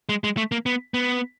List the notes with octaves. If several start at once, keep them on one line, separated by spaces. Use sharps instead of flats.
G#3
G#3
A3
A#3
B3
B3